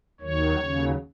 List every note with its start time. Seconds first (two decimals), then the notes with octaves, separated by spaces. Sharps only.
0.21 D#2 D#3 F#3 C#5
0.57 D#2 C#3 F#3